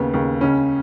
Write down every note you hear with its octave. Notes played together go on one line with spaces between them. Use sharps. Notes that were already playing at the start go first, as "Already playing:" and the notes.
Already playing: D#2 C#3 B3
D#2 C#3
C#2 C#3 C#4